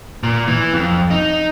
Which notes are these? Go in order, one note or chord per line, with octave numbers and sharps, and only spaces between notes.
A#2
E3
F2
D#4